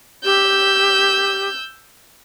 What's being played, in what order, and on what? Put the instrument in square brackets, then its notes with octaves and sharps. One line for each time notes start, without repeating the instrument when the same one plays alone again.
[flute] G4 [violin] E6 G6